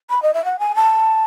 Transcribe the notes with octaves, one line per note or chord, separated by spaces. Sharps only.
B5
D#5
E5
F#5
G#5
A5